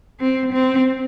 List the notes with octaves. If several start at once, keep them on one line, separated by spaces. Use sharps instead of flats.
C4
C4